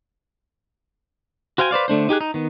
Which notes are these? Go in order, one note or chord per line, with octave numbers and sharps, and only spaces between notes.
F#4 C5 F5 G5 G#5
B4 C5 D5 F5
D3 A3 D4 C5
D#4 G4 G#4 F#6
D#4
D#3 B3